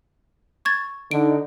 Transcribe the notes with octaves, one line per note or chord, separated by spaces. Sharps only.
C#6 G#6 A6
D3 D#4 D7